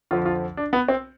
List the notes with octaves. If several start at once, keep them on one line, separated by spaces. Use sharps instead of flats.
F2 D3 F3 F4
F4
D4
B3
C4